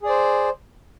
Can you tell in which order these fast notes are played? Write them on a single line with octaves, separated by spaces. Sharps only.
G#4 D5 C5